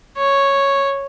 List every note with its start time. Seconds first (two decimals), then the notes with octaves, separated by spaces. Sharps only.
0.18 C#5